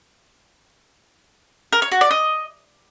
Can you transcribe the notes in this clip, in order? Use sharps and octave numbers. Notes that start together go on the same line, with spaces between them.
A#4
C#5
F#4
D5
D#5